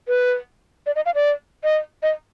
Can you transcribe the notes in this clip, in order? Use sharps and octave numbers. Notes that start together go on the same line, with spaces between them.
B4
D5
D#5
F5
D5
D#5
D#5